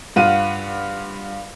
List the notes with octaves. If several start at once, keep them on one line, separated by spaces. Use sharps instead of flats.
G2 F4 F#5 D#7